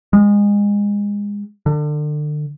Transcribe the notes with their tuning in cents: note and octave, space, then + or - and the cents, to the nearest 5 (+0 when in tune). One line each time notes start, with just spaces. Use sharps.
G#3 -25
D3 +30